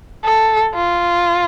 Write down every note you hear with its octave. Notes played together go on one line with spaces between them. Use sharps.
A4
F4